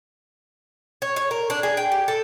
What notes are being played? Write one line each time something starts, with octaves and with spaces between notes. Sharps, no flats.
C#5
C#5
A#4
D4
G#4
G5
G4
A4